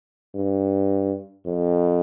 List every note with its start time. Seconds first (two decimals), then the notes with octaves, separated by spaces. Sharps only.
0.35 G2
1.45 F2